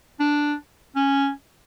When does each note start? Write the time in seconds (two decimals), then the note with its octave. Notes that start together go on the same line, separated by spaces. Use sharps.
0.20 D4
0.96 C#4